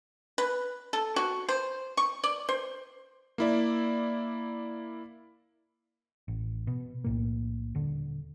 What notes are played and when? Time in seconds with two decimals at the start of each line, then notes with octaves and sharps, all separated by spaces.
0.38 B4
0.93 A4
1.16 F#4
1.49 C5
1.97 C#6
2.24 D5
2.49 C5
3.38 A#3 E4 D5
6.28 A1
6.67 B2
7.04 B1 A2 A#3
7.75 D#1 D3